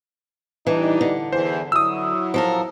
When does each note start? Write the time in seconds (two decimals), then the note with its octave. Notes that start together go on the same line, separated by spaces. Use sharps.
0.67 E3 G3 D4 D#4
1.01 D3
1.33 E2 E3 C5
1.72 F#3 E4 D#6 E6
2.34 F3 A4 A#4